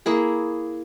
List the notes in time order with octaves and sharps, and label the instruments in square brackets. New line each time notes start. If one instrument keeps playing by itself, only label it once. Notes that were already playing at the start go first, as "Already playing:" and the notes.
[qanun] A#3 E4 G#4